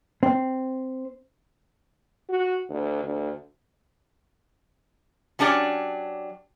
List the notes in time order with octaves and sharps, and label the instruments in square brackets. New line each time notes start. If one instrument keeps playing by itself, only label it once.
[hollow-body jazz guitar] C4
[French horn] F#4
D2
D2
[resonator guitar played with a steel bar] F#3 C#4 D4 G4 D5